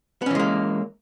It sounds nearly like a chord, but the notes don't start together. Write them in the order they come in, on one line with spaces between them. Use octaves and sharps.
B3 C#4 E3 G#3 A#3